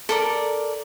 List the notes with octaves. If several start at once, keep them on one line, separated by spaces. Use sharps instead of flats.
A4 A#4 D5